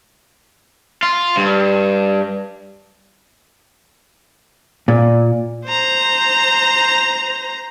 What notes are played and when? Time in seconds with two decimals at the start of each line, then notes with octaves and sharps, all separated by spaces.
1.03 F4
1.37 G2
4.88 A#2
5.66 C5 A#5